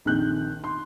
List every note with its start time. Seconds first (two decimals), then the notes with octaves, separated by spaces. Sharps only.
0.05 A#1 F2 D#3 F#6 G6
0.64 C6